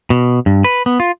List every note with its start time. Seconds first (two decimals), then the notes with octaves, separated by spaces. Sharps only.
0.10 B2
0.46 G2
0.64 B4
0.86 B3
1.00 F4